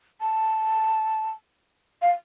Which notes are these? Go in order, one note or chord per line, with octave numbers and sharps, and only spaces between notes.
A5
F5